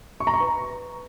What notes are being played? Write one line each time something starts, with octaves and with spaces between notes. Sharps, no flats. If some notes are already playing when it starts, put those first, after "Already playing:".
C#6
A#5
C#6
B4